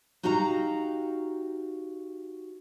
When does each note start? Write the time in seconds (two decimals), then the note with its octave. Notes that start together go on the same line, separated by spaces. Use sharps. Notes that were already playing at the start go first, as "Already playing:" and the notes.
0.23 D#4 F#4 G4 F5 A#5